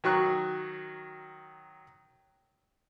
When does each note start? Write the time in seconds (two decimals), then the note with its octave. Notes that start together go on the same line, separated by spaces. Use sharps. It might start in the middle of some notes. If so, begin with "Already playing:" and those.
0.04 D#3 F#3 C#6 F#6